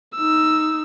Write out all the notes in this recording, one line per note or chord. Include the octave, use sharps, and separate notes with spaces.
D#4 E6